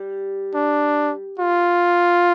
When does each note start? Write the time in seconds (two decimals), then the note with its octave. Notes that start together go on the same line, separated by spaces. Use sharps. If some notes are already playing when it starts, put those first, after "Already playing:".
Already playing: G3
0.54 D4
1.39 F4